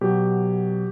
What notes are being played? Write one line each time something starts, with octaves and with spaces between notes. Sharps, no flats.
B2 F#3 G4